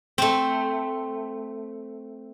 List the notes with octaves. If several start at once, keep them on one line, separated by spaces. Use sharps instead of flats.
A3 C4